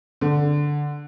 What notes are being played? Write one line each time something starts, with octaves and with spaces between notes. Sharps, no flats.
D3